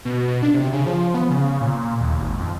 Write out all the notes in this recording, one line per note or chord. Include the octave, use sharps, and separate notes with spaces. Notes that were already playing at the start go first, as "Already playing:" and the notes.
B2
B2
D4
C3
C#3
F3
B3
C#3
A#2
D#2
G#1
F2